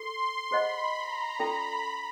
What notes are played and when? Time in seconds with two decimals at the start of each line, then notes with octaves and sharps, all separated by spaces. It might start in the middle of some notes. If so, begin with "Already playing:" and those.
Already playing: A4 C6
0.51 G#4 C5 D#5 F#5 B5
0.96 A#5
1.39 C#4 F4 A4 D5 G5 B5